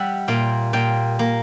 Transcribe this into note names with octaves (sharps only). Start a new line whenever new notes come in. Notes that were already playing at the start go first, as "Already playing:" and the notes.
Already playing: G3 E5 F#5
A#2 F5 G5
A#2 F5 G5
A#3